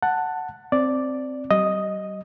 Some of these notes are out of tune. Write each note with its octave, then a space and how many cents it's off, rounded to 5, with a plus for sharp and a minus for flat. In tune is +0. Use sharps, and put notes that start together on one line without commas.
F#5 +0 A5 +10
C4 +0 D5 +0
G3 -35 D#5 +0